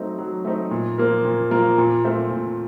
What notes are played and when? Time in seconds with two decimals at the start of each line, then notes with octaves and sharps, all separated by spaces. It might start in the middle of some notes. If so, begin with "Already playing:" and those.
Already playing: F#3 A3 C4 D#4
0.19 F#3
0.45 A3 C4 D#4
0.71 A#2
0.98 F3 A#3 F4 A#4
1.25 A#2
1.51 F3 A#3 F4 A#4
1.78 A#2
2.04 A3 C4 F4 C5
2.31 A#2